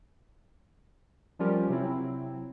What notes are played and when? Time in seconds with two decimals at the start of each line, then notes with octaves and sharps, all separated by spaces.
1.39 F3 G3 C#4 F4 G4 A#4
1.69 C3 F#3 C4 E4